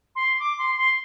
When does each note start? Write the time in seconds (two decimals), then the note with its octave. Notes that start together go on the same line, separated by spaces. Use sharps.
0.15 C6
0.36 C6
0.39 D6
0.58 C6
0.77 C6